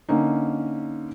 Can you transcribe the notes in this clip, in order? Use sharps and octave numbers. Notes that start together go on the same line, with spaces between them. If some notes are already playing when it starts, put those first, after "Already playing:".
D3 A#3 C#4 D#4